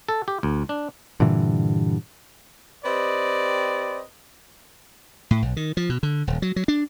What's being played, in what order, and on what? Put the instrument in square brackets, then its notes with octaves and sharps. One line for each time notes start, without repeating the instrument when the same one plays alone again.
[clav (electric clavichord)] A4
G4
D2
D4
[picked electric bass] G2 A#2 D3 E3
[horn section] C4 G4 B4 D5 D#5
[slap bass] A2
B1
D#3
F3
B2
D3
D#1
F#3
F#3
D4